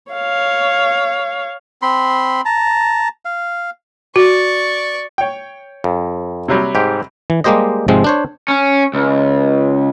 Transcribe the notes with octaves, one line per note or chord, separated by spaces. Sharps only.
C#5 F5
C4 B5 C6
A5 A#5
F5
F#4 D5 C#6
C#5 G5
F2
C3 F#3 G3
G#2 G4
E3
G3 G#3 A#3 G4 C5 D#5
G#2 C3 F3 G#3 C4
D4 C5 C#5
C#4
C#2